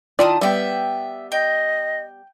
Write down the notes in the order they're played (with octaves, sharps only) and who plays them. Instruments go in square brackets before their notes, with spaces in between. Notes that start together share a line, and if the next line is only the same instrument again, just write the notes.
[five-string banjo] D#3 F4 D5 [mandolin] E4 A5 D#6
[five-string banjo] G3 B3 [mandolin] E5 G5
[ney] D#5 [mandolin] G5